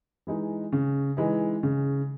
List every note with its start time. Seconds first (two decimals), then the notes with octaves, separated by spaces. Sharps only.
0.27 E3 G#3 D#4
0.72 C#3
1.17 E3 G#3 D#4
1.63 C#3